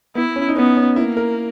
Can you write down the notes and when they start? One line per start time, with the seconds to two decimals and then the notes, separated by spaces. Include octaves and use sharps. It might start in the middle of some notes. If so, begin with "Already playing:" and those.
0.15 B3 E4
0.36 C#4
0.49 D#4
0.57 B3 C#4
0.76 C#4
0.96 A#3 E4
1.17 A#4